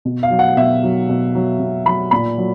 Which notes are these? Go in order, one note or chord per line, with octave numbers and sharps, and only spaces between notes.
B2
F5
F#3
F#5
B2 E5
F#3
B2
F#3
B2
F#3 B5
A#2 B5
F#3